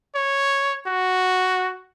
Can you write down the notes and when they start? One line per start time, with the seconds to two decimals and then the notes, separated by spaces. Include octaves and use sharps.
0.15 C#5
0.87 F#4